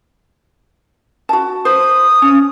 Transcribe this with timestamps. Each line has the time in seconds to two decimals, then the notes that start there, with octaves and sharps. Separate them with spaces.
1.29 F#4 A5
1.65 C5 D#6
2.22 C#4